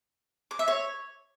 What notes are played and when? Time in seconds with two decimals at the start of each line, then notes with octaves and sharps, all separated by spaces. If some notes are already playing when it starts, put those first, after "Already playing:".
0.51 D6
0.59 E5
0.68 C#5